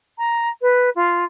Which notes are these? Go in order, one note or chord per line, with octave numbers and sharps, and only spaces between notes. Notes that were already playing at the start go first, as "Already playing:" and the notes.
A#5
B4
F4